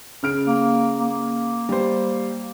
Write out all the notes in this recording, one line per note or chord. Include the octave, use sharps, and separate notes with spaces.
C#3 F6 D7
A#3
A#3
G3 C5